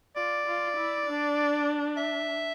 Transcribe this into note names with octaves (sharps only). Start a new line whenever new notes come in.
F4 D5
F4
E4
D4
E5